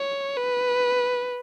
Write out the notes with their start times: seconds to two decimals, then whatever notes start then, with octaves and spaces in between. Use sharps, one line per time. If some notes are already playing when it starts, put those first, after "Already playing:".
Already playing: C#5
0.37 B4